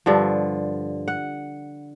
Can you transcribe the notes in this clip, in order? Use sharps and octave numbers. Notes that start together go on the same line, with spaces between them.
G2 D3 F3
F#5